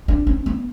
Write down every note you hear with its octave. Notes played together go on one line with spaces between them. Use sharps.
D4
C#4
B3